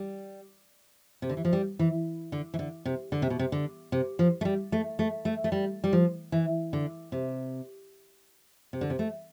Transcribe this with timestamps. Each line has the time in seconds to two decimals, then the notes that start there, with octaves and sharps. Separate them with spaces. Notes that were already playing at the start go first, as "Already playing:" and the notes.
Already playing: G3
1.22 C3
1.29 D3
1.37 E3
1.45 F3
1.53 G3
1.79 E3
2.32 D3
2.54 E3
2.59 D3
2.85 C3
3.12 D3
3.22 C3
3.30 B2
3.39 C3
3.52 D3
3.92 C3
4.19 F3
4.41 A3
4.45 G3
4.72 A3
4.99 A3
5.25 A3
5.44 A3
5.52 G3
5.84 G3
5.93 F3
6.32 E3
6.73 D3
7.12 C3
8.73 C3
8.81 D3
8.90 C3
8.99 A3